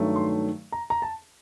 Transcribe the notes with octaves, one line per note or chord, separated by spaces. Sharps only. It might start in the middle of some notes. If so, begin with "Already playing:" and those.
Already playing: G2 D#3 F#3 A3
C6
A#5
A#5
A5